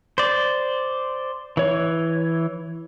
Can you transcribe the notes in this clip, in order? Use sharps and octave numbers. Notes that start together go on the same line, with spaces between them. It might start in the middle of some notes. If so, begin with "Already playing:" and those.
C5 D5
E3 C#5